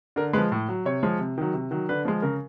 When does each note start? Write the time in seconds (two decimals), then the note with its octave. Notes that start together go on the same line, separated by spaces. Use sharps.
0.16 D3 A#4
0.33 G#3 B4
0.38 F3
0.52 A2
0.68 F#3
0.85 C3 C#5
1.03 F3 G#3
1.19 C3
1.38 D#3 F#3
1.54 C3
1.71 D#3 F#3
1.89 D3 B4
2.05 F3 G#3
2.22 C#3 A#4